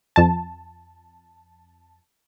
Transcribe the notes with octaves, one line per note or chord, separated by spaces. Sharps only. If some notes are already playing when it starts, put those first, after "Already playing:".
F2 A5